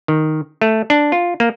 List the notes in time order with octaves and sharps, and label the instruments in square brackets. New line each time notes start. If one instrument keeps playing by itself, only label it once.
[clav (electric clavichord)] D#3
A3
D4
F4
A#3